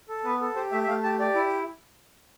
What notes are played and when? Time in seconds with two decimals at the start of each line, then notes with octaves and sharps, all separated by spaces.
0.08 A4
0.24 B3 B4
0.40 A4
0.55 G4 C5
0.71 A3 E5
0.83 E5
0.87 A3 F5
1.03 G4 A5
1.19 G4 D5
1.35 E4